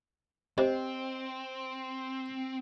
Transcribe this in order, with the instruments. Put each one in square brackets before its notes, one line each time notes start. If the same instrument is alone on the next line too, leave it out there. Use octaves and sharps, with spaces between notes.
[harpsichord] C3 [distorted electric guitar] C4 [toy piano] C5 D#5